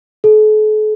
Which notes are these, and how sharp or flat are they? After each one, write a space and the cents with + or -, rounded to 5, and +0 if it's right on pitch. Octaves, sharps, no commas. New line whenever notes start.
A4 -45